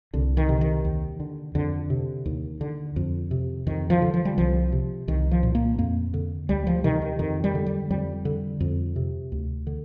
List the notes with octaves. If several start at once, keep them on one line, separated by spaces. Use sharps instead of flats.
C2 D3
D#3
C3
D#3
D#2
D3
F2 D3
C3
D#2
D3
F2
C3
F2 D#3
F3
D3
F3
G3
C2 F3
C3
C2 D#3
F3
A#2
A#3
F2 A#3
D3
D2 G3
F3
C3 D#3
D#3
F2 D#3
G3
D3
G3
F2 G3
D3
F2
C3
D2
D3